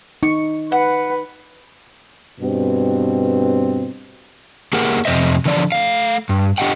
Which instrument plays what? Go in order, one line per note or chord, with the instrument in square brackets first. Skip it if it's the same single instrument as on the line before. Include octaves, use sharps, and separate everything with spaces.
[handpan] D#4 [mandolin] C#6
[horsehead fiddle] B4 [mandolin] F#5
[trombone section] G2 B2 C4
[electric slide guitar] A#3 G4 G#4 A#4 F#5
F2 C3 C5 D#5 E5
D3 E3 F3 D5
A3 F5
G2
D4 G4 D#5 F#5 G5